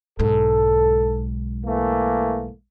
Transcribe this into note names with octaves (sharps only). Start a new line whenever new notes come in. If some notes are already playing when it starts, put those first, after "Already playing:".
B1 G#2 A4
E3 A3 A#3